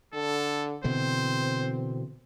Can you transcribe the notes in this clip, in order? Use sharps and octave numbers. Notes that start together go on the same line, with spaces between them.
D3 A4
B2 D3 E3 C4 C5